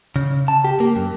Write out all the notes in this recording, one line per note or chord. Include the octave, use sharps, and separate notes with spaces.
C#3
A5
G4
A#3
F#2